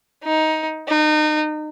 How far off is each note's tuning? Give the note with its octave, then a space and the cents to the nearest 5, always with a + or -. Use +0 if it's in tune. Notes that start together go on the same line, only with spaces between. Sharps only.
D#4 +15
D#4 -30